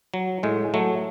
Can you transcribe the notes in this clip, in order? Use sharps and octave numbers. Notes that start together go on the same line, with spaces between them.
F#3
A2 G#3
F#3 A3